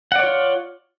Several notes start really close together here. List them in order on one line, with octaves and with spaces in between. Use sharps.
F#5 D5 C#5 F4